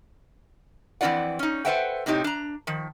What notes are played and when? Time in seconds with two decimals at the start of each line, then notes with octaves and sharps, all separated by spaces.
1.01 F2 E3 C4 F4 D5 F#5
1.39 C#4 D#4
1.65 A4 B4 C5 E5 F#5 G5
2.06 A2 C3 C4 D#4 G4 C#5
2.24 D4 A#5
2.67 D#3 F3